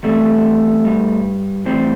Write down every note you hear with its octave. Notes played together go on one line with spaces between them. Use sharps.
E2 C3 G3 A3
G2 G3
A2 E3 G3 C4